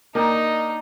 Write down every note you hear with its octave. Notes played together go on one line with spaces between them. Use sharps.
A#3 D4 D#4 D#5 G5 A#5